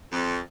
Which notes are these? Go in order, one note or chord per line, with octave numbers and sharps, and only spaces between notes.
F2